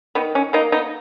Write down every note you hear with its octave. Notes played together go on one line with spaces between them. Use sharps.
D#3 B3
C#4
A#3 B3 D#4
B3 D#4